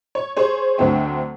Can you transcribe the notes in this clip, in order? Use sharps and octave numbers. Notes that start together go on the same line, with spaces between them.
C#5
G#4 C5 C#5
D2 D3 F#3 C4 E5 G5